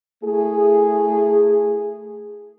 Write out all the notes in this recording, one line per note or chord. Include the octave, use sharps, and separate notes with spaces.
A3 E4 G#4